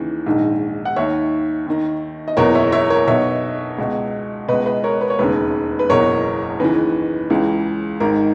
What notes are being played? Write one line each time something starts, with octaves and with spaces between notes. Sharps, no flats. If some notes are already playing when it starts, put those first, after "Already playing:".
Already playing: D#2 C#3 E3
A#1 G#2 D#3
F#5
D#2 D#3 C#5 E5
D#2 D#3
D#5
F#1 E2 B2 A#4 C#5
C#5 E5
C#5 E5
A#4 C#5
B1 B2 C#5 E5
C#2 B2
C#2 B2 B4 D#5
B4 D#5
A#4 C#5
B4
C#5
E1 D#2 C#3 B4
B4
F#1 E2 B2 A#4 C#5
D#2 C#3 E3 B4
C#2 C#3 E3
G#1 G#2 D#3 A#4